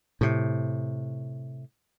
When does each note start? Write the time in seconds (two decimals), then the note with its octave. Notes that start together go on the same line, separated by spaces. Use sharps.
0.21 A2 C3